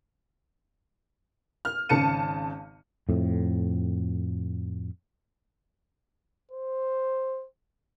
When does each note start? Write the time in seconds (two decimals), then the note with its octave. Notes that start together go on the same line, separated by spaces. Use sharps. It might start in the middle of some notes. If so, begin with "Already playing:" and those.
1.65 F6
1.89 G#1 C#3 A5 C#7 D#7
3.09 F2 A2
6.51 C5